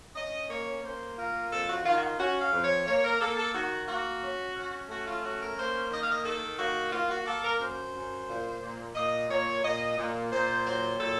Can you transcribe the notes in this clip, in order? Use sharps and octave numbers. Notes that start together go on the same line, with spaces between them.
C#4 D#5
A#3 C#5
A#3 C5
F4 A#4
F2 A4
F#4
D#3 F4
F#4
F4
C#4 F#4
F5
F2
C#5
A#3 C#5
A#4
A#3 A4
A4
D#3 F#4
A#3 F#4
C#4
C#4
A3 F#4
F4
C#4 F#4
A#4
A#3 C5
D#3 D#5
F5
D#5
D#3 A4
A#3 F#4
A#3 F4
F#4
A#3 A4
A#4
F#2 C5
F#2
A#2
A#2
A#2 D#5
A#2 C#5
A#2 D#5
A#2
A#2 C5
F#3 C5
A#2 A4